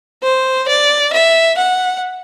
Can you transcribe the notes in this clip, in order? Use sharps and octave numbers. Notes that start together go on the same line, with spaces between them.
C5
D5
E5
F#5